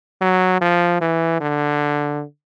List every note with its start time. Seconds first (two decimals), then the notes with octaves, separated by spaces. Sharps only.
0.21 F#3
0.61 F3
1.01 E3
1.41 D3